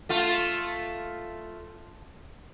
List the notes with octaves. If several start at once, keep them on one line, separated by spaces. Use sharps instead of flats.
A3 F4